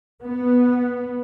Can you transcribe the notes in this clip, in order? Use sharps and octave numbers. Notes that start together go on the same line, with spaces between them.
B3